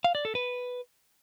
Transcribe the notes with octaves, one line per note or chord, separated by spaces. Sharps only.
F5
D5
A4
B4